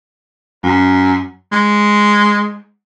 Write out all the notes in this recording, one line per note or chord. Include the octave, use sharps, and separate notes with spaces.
F#2
G#3